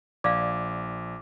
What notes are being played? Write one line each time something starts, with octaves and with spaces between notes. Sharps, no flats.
A#1 D5 F5 D6